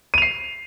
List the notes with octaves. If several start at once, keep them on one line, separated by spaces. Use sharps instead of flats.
C7 D#7 F7